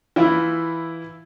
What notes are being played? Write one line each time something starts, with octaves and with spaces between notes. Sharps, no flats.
E3 E4 F4